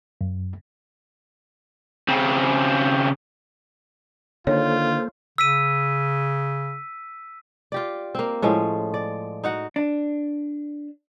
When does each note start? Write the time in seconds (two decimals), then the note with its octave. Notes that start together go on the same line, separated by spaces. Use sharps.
0.21 F#2
2.08 C#3 C4
4.47 D3 D#3 A#3 F4 A4 C5 C#5
5.38 C#3 E6 B6 D#7
7.72 F4 G4 D5
8.15 A#3 C4
8.42 A2 F3 G#3 C#4
8.94 D5
9.44 D#4 F#4 F#5
9.76 D4